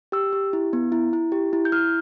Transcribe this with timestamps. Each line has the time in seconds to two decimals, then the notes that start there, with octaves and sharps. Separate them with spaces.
0.12 G4 E6
0.33 G4
0.53 E4
0.73 B3
0.92 E4
1.13 E4
1.32 G4
1.53 E4
1.65 G6
1.72 E4 F6